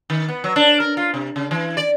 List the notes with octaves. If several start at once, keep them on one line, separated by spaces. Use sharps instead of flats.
D#3
B3
F#3
D4
A#4
F4
C3
C#3
E3
D5